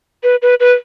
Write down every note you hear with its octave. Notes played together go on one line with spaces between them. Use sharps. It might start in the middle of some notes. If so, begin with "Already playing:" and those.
B4
B4
B4